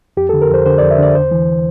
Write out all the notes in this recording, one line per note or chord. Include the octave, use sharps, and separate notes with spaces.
F2 G4
A4
D3
A#4
F2 C5
D3 C5
D5
F2
E5
D3 D5
E2 C5
E3